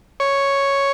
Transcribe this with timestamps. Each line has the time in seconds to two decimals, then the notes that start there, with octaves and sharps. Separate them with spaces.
0.20 C#5